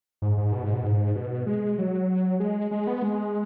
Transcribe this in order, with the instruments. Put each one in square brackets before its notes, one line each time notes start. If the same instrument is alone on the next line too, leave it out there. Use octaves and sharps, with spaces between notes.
[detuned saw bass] G#2
G#2
B2
G#2
B2
G#2
B2
G#3
F#3
G#3
G#3
B3
G#3